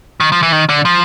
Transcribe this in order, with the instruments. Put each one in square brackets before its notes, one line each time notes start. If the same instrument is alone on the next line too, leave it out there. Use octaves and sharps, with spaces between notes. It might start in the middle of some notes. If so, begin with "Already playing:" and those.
[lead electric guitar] D#3
F3
E3
D#3
D3
F3